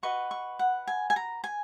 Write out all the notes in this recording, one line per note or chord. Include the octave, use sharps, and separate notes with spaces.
F#4 B4 D#5 C#6
C#6
F#5
G#5
G#5
A#5
G#5